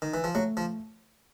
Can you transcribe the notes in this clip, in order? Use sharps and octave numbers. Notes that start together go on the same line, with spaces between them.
D#3
E3
F3
F#3 A3
F3